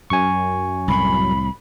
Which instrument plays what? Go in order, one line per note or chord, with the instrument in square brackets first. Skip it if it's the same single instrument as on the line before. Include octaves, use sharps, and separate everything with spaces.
[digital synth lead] F#2 [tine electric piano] G#5 C#6
[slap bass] C2 A2 [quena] B5